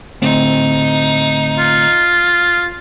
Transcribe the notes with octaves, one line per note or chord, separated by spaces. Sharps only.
D2 A2 C4 D#4
F4